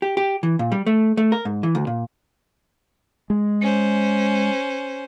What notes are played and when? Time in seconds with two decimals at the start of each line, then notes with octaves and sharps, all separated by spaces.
0.02 G4
0.17 G4
0.43 E3
0.59 A#2
0.72 G3
0.86 A3
1.17 A3
1.32 A#4
1.45 G#2
1.63 E3
1.75 D2
1.87 A#2
3.30 G#3
3.62 C#4 C5